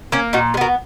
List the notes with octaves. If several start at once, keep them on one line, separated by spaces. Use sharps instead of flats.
A#3 C#4
A#2 D#4 F#4
G#3
B3 F#4 A#4